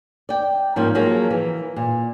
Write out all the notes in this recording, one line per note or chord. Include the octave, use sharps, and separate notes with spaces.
D5 G5
G#2 F3 A#3 C#4
F3 F#3 A#3 G#4
E3
A#2